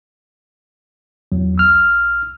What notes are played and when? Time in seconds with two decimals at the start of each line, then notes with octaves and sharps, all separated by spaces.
1.32 E2 F#3
1.56 B1 E6 F6